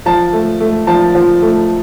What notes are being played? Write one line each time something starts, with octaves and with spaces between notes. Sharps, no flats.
F3 A5
A3
A3
F3 A5
F3
A3